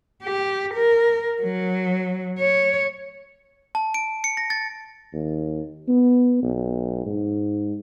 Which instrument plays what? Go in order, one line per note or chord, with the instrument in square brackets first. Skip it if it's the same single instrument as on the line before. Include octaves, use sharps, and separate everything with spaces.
[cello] G4
A#4
F#3
C#5
[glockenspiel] A5
D7
C#7
A#6
A6
[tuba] D#2
B3
B1
G#2